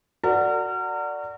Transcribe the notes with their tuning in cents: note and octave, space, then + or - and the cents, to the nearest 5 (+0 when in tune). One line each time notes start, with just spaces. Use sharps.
F#4 +0 A#4 -35 D5 +0